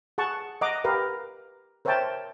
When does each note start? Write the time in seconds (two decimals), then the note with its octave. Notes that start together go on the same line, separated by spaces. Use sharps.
0.18 G#4 F#5 A5 C#6
0.61 D#5 F#5 A#5 D6
0.84 G4 A#4 B4 F5
1.85 A#4 C5 C#5 E5 G5 A5